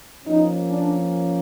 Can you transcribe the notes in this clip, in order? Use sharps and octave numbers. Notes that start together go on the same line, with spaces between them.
F3 A#3 C#4 D#4
D4